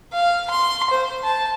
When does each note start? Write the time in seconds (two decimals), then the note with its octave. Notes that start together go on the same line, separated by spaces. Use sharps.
0.12 F5
0.50 C6
0.90 C5
1.23 A5